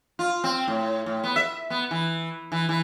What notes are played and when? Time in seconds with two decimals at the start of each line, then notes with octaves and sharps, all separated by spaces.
0.19 F4
0.44 C4
0.68 A2
1.06 A2
1.24 B3
1.36 E5
1.70 B3
1.91 E3
2.52 E3
2.69 E3